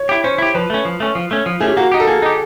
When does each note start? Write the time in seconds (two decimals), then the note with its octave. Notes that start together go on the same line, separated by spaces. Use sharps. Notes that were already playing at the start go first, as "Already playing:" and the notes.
Already playing: C#5
0.09 E4 G4
0.24 C#4 C5
0.38 E4 G4
0.55 F3 B4
0.70 A3 C#4
0.85 F3
1.00 A3 C#4
1.15 F3
1.31 A3 C#4
1.46 F3
1.60 A3 C#4 G#4
1.68 G4
1.77 A#3 F#4
1.92 D#4 G4
2.00 A4
2.07 A#3 G#4
2.22 D#4 G4